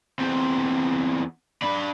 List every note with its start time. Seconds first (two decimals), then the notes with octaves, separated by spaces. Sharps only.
0.19 E2 C4
1.62 D4 B5